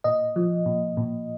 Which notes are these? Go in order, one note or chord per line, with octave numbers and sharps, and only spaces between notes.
A#2 D#5
F3
A#2
A#2